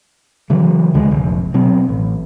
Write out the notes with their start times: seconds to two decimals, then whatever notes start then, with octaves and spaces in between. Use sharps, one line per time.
0.50 C#3 E3 F#3
0.94 D2 D3 G#3
1.11 F1 A#1
1.54 B2 F#3 C4
1.89 A1